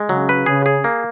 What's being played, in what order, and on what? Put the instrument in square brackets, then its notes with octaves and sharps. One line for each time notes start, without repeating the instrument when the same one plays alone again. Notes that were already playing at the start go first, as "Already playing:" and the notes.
Already playing: [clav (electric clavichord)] G#3
[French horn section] C#3 [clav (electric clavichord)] F#3
[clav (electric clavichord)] B4
[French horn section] C#3 [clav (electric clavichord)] G#4
[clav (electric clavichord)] G#4
A#3